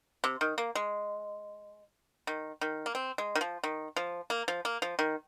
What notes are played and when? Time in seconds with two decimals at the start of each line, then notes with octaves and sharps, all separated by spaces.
0.24 C3
0.41 D#3
0.58 A#3
0.75 G#3
2.27 D#3
2.61 D#3
2.86 A#3
2.95 C4
3.18 G#3
3.35 D#3
3.41 F3
3.64 D#3
3.96 F3
4.30 A#3
4.48 F3
4.65 A#3
4.82 F3
4.99 D#3